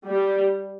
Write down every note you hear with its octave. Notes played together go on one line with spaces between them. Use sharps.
G3